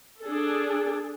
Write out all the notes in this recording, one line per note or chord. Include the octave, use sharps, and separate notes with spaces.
D4 G#4 A4